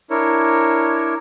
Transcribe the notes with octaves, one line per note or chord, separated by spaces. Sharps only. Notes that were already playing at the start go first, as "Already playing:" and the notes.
D4 E4 A#4 C#5